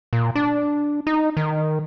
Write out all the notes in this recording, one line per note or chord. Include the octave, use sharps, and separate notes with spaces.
A#2
D4
D#4
D#3